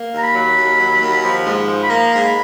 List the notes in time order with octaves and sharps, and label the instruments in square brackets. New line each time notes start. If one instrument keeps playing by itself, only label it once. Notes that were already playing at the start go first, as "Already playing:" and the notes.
Already playing: [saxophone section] A#3
D#2
[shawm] A#5
B5
[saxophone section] F#3
D#2
F#3
D#2
F3
G#2
F3
[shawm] B5
[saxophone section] A#3 [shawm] A#5
[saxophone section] G#2
[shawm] B5